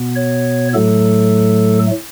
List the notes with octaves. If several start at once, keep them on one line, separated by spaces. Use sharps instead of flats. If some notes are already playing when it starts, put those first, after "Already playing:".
Already playing: B2 B3
C#5
A2 F#3 A3 A4